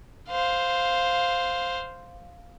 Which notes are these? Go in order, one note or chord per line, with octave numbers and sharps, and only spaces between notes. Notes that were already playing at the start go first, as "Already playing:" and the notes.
C5 F5